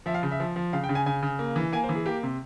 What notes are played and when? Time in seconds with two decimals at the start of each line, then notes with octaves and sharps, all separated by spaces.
0.06 F3 E5
0.14 F5
0.23 C#3
0.31 E5
0.40 F3
0.56 F3
0.73 C#3 F5
0.84 G5
0.89 C#3
0.95 G#5
1.06 C#3 G#5
1.23 C#3
1.39 A#3
1.56 E3
1.73 A#3 G#5
1.84 C5
1.89 E3
1.95 G#4
2.06 A#3 G4
2.23 C3